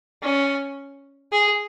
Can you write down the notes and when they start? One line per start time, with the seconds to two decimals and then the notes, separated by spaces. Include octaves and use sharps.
0.23 C#4
1.32 G#4